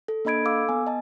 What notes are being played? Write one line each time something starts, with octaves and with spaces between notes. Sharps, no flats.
A4
A#3 D4 D#5 B5 G#6 D7
A4 F5 D6 E6
B3 G#5
D#5 A5